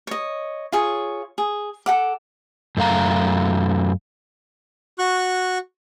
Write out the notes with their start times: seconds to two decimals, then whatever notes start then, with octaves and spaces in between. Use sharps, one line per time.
0.07 C#5 D#5
0.72 F4 G#4 C#5
1.38 G#4
1.86 A4 F#5 D6
2.77 F#2 A3 F5 A#5
4.99 F#4 C#6 F#6